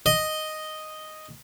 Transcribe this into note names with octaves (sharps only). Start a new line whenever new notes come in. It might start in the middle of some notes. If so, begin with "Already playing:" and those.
D#5